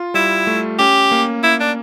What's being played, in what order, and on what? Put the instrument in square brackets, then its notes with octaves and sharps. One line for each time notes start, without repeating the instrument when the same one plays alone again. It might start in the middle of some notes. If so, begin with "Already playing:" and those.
Already playing: [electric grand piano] F4
[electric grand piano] G3 [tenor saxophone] E4
[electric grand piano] A3
[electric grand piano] C#4 [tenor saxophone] G4
[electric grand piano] A#3
[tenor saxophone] E4
D4